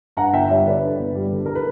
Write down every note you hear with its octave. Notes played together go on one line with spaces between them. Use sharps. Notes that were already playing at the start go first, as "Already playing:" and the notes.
G2 F#5 A#5
G1 E5 G5
G3 C#5 E5
D3 B4 D5
G2
G1
G3
D3
A#4
B4